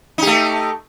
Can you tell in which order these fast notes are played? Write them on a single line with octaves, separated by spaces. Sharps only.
D#4 G4 A3